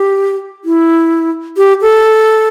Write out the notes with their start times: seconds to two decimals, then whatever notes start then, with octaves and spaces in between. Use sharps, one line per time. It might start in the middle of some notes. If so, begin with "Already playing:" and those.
Already playing: G4
0.65 E4
1.57 G4
1.81 A4